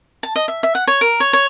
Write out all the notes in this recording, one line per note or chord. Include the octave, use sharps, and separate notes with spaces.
A5
D#5
E5
E5
F#5
C#5
A#4
C#5
C#5